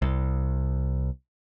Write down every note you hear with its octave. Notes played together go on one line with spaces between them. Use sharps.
C2